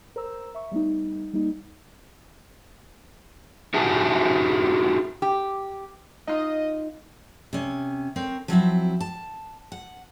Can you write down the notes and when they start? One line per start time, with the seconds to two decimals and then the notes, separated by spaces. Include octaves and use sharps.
0.16 A#4 C5 A#5 E6
0.55 E5 C#6
0.72 G3 A3 B3 D#4
1.33 G3 A#3 D#4
3.74 D#4 E4 F#4 G4 G#5 A5
5.22 G4
6.27 D#4 F4 D#5
7.53 C3 C#4
8.16 C4 A#4 C#5
8.48 F3 F#3 C4 E4
9.01 A5
9.72 F#5